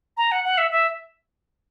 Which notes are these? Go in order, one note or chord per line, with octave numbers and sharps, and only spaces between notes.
A#5
F#5
F#5
E5
E5